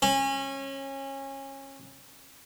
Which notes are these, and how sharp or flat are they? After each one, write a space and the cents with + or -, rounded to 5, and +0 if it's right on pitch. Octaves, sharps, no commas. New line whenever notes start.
C#4 -25